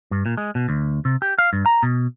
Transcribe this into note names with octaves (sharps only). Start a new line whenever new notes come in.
G2
A#2
G#3
B2
D2
C3
G4
F5
G2
A#5
B2